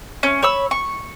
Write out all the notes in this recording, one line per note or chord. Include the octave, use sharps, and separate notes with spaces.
C#4
C#5 B5 E6
C#6